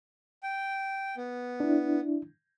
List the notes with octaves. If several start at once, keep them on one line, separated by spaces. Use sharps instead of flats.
G5
B3
D4 E4